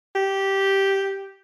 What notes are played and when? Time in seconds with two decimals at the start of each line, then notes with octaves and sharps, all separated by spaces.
0.15 G4